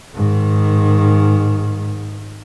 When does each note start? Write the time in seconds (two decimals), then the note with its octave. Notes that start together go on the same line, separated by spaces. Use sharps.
0.15 G#2 D#3